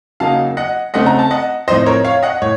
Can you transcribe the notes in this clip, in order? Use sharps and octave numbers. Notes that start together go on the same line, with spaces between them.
C#3 F#3 A#3 D#4 F5 A5
D#5 F#5
C#3 A3 C4 D#4 D#5 F#5
A#5
A5
D#5 F#5
A2 F3 C4 D#4 C5 D#5
A#4 C#5
C#5 F5
D#5 F#5
A2 C#5